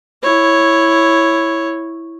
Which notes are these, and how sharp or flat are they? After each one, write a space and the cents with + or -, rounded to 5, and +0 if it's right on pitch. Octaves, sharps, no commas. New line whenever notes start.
E4 +0 C#5 -5